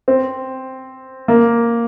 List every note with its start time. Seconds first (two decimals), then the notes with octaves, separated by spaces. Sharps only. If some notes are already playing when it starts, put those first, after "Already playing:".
0.08 C4
1.28 A#3